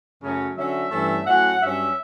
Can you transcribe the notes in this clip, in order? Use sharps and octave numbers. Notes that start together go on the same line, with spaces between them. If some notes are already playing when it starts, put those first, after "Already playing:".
F#2 C#3 F#3 A3 C#4
D3 F#3 C#4 E5
G2 E3 A3 C#4
A2 F#3 C#4 F#5
G2 F#3 C#4 E5